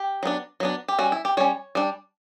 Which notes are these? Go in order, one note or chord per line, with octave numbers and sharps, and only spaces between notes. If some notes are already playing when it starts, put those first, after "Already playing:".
Already playing: G4
F#3 B3 D4
F#3 B3 D4
G4
G3 C#4 F#4
E4
G4
G3 C#4 C#5
G3 D4